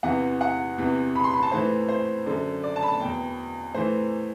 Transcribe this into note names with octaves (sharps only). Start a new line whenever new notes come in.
E2 C3 E3 F#5
F#5
E2 C3 E3
B5
C6
B5
A5
A2 E3 C5
C5
F#2 D3
D5
A5
B5
A5
E2 B2 G5
A2 E3 C5